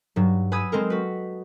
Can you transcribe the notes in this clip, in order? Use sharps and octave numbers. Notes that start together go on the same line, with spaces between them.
G2 F#3
B4 G#5 B5 D#6 E6 G#6
G#3 C4 A4 A#4
F#4 B4